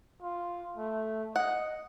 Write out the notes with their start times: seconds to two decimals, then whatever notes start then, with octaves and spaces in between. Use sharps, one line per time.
0.22 F4
0.77 A3
1.36 D#5 F#5